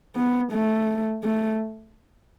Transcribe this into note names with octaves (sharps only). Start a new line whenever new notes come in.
B3
A3
A3